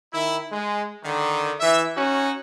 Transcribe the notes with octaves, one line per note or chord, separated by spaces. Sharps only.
D#3 E4
G#3
D3 D#3
E3 E5
C#4 D#4 F#4